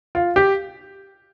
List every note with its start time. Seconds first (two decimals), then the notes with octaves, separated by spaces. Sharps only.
0.15 F4
0.36 G4